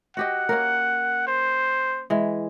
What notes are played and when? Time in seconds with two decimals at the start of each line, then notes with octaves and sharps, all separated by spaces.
0.17 F#4 G4 D#5 F#5
0.49 A#3 C#4 A#4
1.27 C5
2.10 E3 G#3